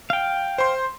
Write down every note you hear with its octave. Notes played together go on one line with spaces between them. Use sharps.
F5 G5
C5 C6